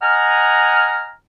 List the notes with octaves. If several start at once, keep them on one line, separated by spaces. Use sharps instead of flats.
D#5 F#5 G#5 A#5 F6